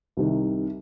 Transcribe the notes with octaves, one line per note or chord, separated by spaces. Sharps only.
C2 C3 D#3